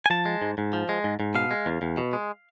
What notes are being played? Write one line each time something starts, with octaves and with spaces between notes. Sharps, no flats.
G#5
F3 A5
G#3
G#2
G#2
F3
G#3
G#2
G#2
B2 F5
G#3
E2
E2
B2
G#3